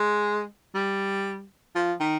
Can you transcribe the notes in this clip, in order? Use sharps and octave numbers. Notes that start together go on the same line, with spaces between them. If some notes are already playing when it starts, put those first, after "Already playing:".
Already playing: G#3
G3
F3
D#3